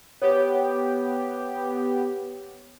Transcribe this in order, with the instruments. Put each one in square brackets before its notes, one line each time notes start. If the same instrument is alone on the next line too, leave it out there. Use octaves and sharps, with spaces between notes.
[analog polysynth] B3 G4 [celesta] C#5